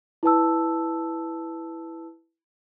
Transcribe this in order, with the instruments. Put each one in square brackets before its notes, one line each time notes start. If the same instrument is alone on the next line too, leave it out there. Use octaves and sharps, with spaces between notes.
[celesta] E4 B4 A5 E6